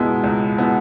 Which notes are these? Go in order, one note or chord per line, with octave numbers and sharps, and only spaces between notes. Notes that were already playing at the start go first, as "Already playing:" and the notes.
Already playing: C#2 B2 G#3 B3 E4
C#2
B2 G#3 B3 E4